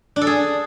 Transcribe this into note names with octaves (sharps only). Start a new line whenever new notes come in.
D4
A4
G#4